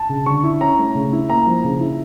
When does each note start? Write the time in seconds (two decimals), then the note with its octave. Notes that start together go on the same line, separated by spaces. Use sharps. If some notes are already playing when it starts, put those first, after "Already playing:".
Already playing: A5
0.09 C#3
0.26 D3 C#6
0.44 E4
0.61 C#4 A#5
0.79 A3
0.95 C#3
1.13 E4
1.30 A#3 A#5
1.46 F3
1.64 C#3
1.80 E4